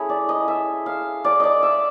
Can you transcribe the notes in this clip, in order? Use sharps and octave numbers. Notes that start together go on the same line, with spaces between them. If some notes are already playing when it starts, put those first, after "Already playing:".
Already playing: A3 C#4 E4 G#4
D5
D#5
E5
F5
D5
D5 D#5
E5